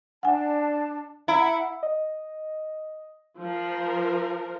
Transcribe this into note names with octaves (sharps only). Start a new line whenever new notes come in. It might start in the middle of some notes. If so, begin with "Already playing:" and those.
D4 F#5 G#5 A5
E4 E5 F#5 A#5
D#5
F3 A#4